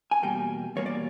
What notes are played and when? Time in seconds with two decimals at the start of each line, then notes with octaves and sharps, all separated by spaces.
0.11 G#5
0.23 E2 B2 G3 A#3 G5
0.76 E2 B2 G3 A#3 C#5
0.86 D5